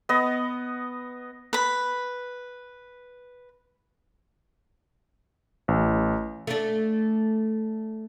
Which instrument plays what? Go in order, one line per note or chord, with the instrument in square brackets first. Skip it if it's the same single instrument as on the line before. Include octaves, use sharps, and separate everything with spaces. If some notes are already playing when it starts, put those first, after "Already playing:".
[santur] B3 D#5
[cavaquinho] B4 B5
[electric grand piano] A1
[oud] A3 D4